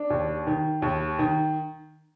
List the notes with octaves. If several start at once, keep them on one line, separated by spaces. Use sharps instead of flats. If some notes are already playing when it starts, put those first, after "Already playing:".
Already playing: D4
D#2
D#3
D#2
D#3